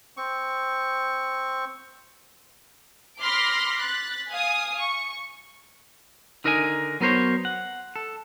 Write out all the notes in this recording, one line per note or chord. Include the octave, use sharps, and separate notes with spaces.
C4 C#6
B5 C6 D6 F6 A#6 B6
F#6 A6 B6
F5 G#5 D#6
C#6
D3 D#4 A#4 D#5 E5 G#5
F#3 B3 A#4 C5 C#5
F#5
A4